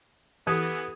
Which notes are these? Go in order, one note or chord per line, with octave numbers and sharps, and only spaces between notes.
E3 B3 G4 A4 D#6 G#6